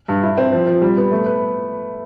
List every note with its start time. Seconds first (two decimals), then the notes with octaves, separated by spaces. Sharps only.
0.08 G2
0.23 E4
0.38 C4
0.52 F3
0.67 F3
0.82 G3
0.97 B3
1.11 A3
1.26 B4